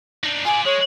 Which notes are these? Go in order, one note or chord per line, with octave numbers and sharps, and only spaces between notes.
D4 D#4
F4 D5 G#5
G#3 C#5